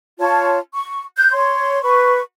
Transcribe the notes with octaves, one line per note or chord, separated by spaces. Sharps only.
F4 C#5 A5
C#6
F#6 G6
C#5 C6
B4 C#6